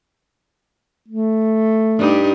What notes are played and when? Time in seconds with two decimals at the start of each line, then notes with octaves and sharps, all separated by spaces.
1.08 A3
1.98 G2 D#4 G4